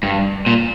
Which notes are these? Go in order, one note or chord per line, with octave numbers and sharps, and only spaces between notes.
G2
A#2